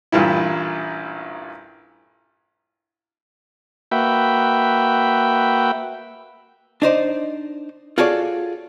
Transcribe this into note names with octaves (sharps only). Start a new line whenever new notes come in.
A1 G2 A#2 E4
A#3 F#4 B4 E5 G5
D4 D#4 C5 D5
F4 F#4 G#4 A4 C#5 D5